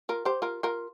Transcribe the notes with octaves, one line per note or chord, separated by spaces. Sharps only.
F4 A#4
G4 C5
F4 A#4
F4 A#4